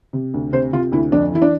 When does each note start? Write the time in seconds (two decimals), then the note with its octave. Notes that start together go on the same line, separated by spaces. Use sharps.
0.13 C3
0.34 D2
0.53 C3 C5
0.73 C3 F4
0.92 D2 E4
1.12 F2 D4
1.32 E3 E4
1.42 D4